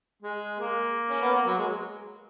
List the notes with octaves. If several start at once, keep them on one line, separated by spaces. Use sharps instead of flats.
G#3
A#3
C#4
B3
A#3
F#3
G#3